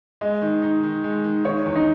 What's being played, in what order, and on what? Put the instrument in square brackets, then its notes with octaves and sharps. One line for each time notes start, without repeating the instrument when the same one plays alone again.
[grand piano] G#3 [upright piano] D#5
[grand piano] D#3
D#4
D#3
G#3
D#3
[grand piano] D#3 [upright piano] C#5
[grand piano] E2
[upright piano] D#4